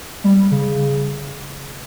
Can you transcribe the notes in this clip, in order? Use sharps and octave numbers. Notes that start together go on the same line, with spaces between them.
G3
C#3